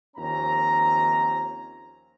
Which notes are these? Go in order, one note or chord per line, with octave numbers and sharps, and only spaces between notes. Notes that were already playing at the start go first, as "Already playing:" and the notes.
D#2 F3 C4 C#4 A#5